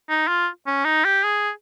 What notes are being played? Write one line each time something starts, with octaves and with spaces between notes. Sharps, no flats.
D#4
F4
C#4
D#4
G4
G#4